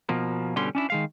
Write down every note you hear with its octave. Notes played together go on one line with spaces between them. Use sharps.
B2 F3 A#3
G2 B2 D3 G3 C#4 C6
C#4 D4 E4
D#3 G#3 F5